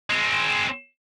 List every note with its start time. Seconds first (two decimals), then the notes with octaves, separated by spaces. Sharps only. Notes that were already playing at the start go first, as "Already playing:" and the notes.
0.10 G#3 C4